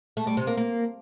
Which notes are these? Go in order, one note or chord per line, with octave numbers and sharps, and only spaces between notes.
A3
G3
C3
A#3
A#3